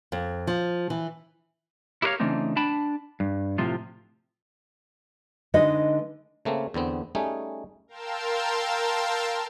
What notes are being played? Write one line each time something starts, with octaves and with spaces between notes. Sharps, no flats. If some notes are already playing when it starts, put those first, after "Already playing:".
F2
F3
E3
E4 G4 A#4 B4 C#5 F5
C#3 E3 A3 C4 D4 D#4
D4 G5 A5 B5
G2
A2 C3 F3 F4
D3 G#3 D#4 B4 D#5
C#3 A3 A#3 C4
E2 D3 B3 C4
G3 A3 C#4 D#4 G#4
A#4 F5 G5 A5 C6 E6